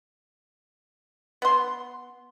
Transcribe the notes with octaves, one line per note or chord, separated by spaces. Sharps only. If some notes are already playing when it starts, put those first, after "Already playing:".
B3 C6